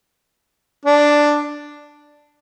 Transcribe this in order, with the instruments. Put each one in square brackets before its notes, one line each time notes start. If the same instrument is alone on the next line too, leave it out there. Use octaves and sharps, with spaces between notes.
[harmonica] D4